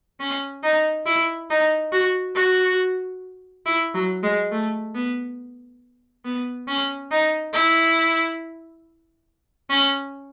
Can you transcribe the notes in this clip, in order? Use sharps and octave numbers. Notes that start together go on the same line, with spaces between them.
C#4
D#4
E4
D#4
F#4
F#4
E4
F#3
G#3
A3
B3
B3
C#4
D#4
E4
C#4